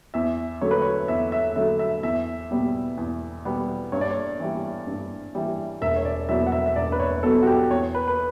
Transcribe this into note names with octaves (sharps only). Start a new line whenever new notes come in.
E2 E5
D3 F#3 A3 C#5
B4
C#5
E2 E5
E5
D3 F#3 A3 E5
E5
E2 E5
B2 G3 B3
E2
B2 G3 B3
G2 C#5
D5
C#5
E3 G3
G2
E3 G3
E1 E5
C#5
D5
E2 B2 F#3 B3 E5
F#5
E5
E5
E1 D5
B4
C#5
E2 B2 F#3 B3 A4
F#4
G4
E2 C#5
B4
B4